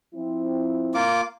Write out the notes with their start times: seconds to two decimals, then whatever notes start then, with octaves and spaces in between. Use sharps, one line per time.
0.14 F3 C4 E4
0.94 A#3 F4 D6